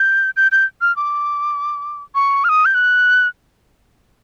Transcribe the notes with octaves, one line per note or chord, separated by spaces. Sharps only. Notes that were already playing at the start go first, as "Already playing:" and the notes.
Already playing: G6
G6
G6
F6
D6
C#6
F6
D#6
G6
F#6